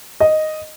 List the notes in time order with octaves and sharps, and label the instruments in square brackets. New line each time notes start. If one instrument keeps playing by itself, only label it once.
[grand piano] D#5